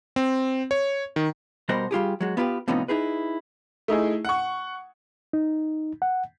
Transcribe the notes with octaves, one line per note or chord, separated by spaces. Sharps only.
C4
C#5
D#3
B2 G3 F#4 A#4 C5 D#5
G3 F4 G4 G#4
F#3 G#3 F#4
B3 E4 F4 G4 B4
A2 C3 F3 B3 C#4 D#4
D#4 E4 G#4 B4
A3 D#4 E4 G#4
F#5 C#6
D#4
F#5